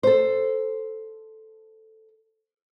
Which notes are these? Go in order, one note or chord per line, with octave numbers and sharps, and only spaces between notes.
A4 C5